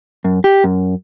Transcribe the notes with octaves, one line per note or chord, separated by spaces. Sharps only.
F#2
G4
F#2